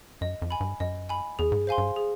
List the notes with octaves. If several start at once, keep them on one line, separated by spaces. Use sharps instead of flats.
F#2 D#5
F2
G#5 B5
G2
F#2 D#5
G#5 B5
E2 G#4
G#2
G2
C5 F5 G#5 C6
G2
G#4